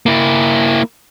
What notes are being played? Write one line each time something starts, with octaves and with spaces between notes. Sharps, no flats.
A#3 E4